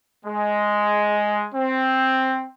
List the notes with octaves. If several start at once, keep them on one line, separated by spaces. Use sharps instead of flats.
G#3
C4